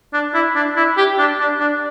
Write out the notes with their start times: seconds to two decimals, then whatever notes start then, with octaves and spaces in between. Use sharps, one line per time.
0.14 D4
0.34 E4
0.56 D4
0.76 E4
0.97 G4
1.18 D4
1.40 D4
1.60 D4